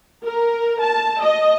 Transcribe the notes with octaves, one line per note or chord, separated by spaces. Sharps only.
A#4
A5
D#5